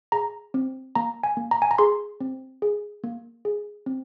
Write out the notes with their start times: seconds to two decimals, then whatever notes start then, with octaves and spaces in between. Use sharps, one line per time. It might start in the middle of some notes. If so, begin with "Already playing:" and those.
0.12 G#4 A#5
0.54 C4
0.95 A#3 A#5
1.23 G#5
1.37 A#3
1.51 A#5
1.62 G#5
1.71 A#5
1.78 G#4 C6
2.21 C4
2.62 G#4
3.04 A#3
3.45 G#4
3.86 C4